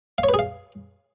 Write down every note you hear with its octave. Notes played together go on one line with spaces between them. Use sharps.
F5
C#5
B4
G#4
F5